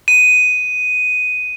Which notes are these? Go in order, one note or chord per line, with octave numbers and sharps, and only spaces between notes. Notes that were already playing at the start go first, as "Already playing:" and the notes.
D#7